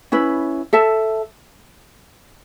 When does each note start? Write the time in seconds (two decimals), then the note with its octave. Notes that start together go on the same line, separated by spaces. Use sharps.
0.12 C#4 E4 B4
0.73 A4 E5 A5